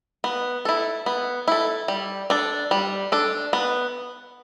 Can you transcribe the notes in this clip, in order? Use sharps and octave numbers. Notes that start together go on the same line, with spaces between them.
B3
E4 A4
B3
E4 A4
G3
D4 A4
G3
D4 A4
B3